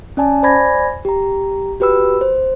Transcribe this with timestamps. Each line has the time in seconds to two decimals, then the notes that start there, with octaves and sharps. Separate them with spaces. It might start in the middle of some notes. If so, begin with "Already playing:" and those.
0.17 C#4 D5 G#5 A5
0.43 C5 D5 G#5 B5 G#6 A#6
1.05 G4 A#5
1.80 F#4 G4 B4 B5 E6
2.21 C5